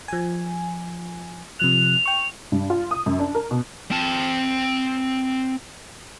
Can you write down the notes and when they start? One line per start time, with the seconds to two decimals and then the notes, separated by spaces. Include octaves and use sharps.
0.08 F3 G#5
1.60 C3 F3 F#6 F7
2.06 G5 C#6
2.52 G2
2.70 F4
2.91 D#6
3.06 F#2
3.19 D4
3.35 A#4
3.51 B2
3.91 C4 A5